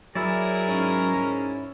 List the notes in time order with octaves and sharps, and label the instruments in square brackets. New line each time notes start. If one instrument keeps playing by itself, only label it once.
[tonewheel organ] F#3 [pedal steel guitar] E4 C#5 D5 [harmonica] G#4 A#4
[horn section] G#2 C#4